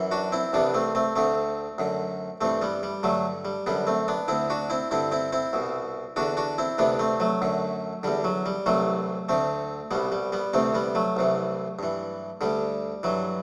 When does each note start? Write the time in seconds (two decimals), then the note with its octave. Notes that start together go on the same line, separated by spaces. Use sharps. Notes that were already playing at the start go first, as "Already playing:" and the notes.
Already playing: F#2 E3
0.11 D4 F#4
0.32 C4 E4
0.53 C2 C3 E3 B3 D4
0.74 A3 C4
0.95 A3 C4
1.16 D2 D3 A3 C4
1.78 F#2 D3
2.41 G2 E3 A3 C4
2.62 G3 B3
2.83 G3
3.03 G2 D3 F#3 A3
3.45 G3
3.66 F#2 D3 G3 B3
3.87 A3 C4
4.08 B3 D4
4.28 D2 D3 C4 E4
4.50 D4 F#4
4.70 C4 E4
4.91 G2 D3 C4 E4
5.12 C4 E4
5.32 C4 E4
5.53 C2 B2
6.16 E2 D3 D4 F#4
6.37 D4 F#4
6.58 C4 E4
6.78 D2 C3 E3 B3 D4
6.99 A3 C4
7.20 F#3 A3
7.42 F#2 D3
8.03 E2 D3 G3
8.24 F#3
8.46 G3
8.66 C2 C3 E3 F#3 A3
9.29 D2 D3 A3 C4
9.91 C2 B2 G3 B3
10.12 G3
10.32 G3 B3
10.53 D2 C3 E3 A3 C4
10.74 G3 B3
10.95 F#3 A3
11.17 C2 C3 E3
11.79 G2 E3
12.41 D2 D3 G3
13.03 G2 E3 F#3